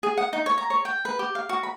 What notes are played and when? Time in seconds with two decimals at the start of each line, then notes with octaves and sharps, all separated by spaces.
0.03 G#4
0.17 F#5
0.33 D#4
0.46 C#5
0.58 A#5
0.70 C#5
0.85 G5
1.05 B4
1.19 G4
1.35 F5
1.49 F#4
1.63 B5